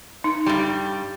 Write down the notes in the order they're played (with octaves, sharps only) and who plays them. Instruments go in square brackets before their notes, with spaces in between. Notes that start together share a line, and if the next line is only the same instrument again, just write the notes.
[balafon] D#4
[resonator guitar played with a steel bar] G2 G3